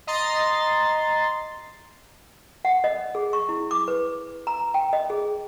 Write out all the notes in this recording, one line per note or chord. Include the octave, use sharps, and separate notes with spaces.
D#5 A#5 C6 A6
F#5
D#5
G#4
C#6
E4
D6
B4
A#5
G5
D#5
G#4